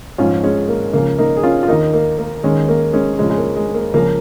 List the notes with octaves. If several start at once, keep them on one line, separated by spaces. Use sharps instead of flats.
G#2 F3 C#4 F4
G#3 C#4
A#3
C#2 C#3 F3 A#3
A#3 D#4
G#4
C#4 F4
F4
D#2 D#3 A#3 D#4
A#3
A#3
D#2 D#3 G#3 C#4
A#3
G#3 C#4
F2 C#3 F3 G#3 C#4
G#3
A#3
G#3
A#3
C#2 C#3 F3 A#3